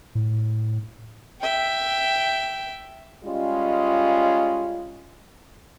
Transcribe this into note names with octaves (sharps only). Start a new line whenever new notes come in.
A2
E5 G5
G3 G#3 C#4 F4 D#5